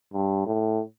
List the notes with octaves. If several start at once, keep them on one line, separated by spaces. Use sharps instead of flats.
G2
A2